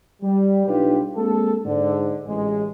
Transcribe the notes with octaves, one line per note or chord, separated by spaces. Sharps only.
G3
B1 D4 D#4 F4 G4 B4
G#3 A#3 C4 A4
G#2 D3
A1 G#3